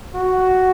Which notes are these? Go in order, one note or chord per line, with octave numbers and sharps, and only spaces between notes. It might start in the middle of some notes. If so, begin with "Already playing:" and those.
F#4